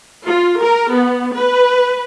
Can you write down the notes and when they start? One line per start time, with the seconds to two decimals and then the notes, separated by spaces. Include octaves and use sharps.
0.25 F4
0.59 A#4
0.92 B3
1.35 B4